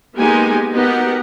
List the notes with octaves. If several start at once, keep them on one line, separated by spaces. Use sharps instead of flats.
G#3 A#3 B3 D#4 G4 G#5
B3 D#4 F#4 G4 A#4 F#5